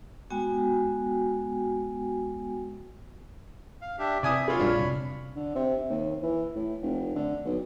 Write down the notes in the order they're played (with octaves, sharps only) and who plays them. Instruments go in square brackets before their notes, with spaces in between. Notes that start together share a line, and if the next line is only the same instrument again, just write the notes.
[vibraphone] G#3 B3 F#4 G5 G#5
[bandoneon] F5
D4 G4 E5
[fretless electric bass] C3 [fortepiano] D5 G#5 D#6 [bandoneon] E5
[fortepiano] F4 G#4 [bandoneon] C#5 B5
[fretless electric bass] F1 A#1 G3 [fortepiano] D4 F4
[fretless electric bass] C3
[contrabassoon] D3
C3
D#2
E3
A2
F1
D3
B1